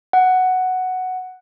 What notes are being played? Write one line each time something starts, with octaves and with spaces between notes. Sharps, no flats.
F#5